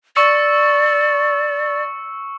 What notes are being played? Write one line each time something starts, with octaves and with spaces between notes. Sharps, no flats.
D5 C#6 E6 C#7